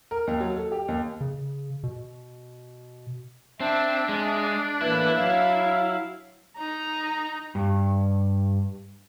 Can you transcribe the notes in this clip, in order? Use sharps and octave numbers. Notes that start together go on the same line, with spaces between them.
A#4
D#2
F#3
A4
G4
D#2
C#3
B2
C4 D4 E5 A5
G#3
A2 E3 A#3 E4 B4
F#3 F5
D#4 A#5
G2